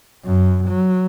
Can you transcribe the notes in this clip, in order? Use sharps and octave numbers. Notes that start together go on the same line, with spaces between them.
F#2
F#3